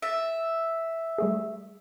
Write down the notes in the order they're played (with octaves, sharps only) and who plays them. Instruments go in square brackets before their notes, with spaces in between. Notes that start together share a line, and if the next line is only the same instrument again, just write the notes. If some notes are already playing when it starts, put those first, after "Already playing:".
[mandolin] E5 [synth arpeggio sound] E6 A6 A#6
[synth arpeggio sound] G3 A3 G#4